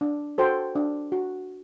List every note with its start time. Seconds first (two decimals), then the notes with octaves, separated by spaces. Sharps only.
0.01 D4
0.38 F#4 A4 C5 G5
0.75 D4
1.12 F#4